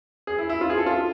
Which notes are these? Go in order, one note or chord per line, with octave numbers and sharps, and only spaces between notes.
G#4
E4
E4
F4
G#4
A4
F4